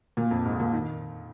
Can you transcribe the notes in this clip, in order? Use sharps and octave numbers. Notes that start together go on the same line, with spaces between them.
A#2
F2
G#2
A#2
D#3